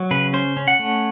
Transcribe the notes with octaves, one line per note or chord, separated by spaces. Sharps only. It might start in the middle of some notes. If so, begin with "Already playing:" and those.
Already playing: F#3
C#3 B4
C#4 C5
C#4
F#5
A3